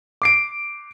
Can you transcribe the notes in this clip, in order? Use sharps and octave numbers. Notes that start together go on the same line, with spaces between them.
D6 C7 D7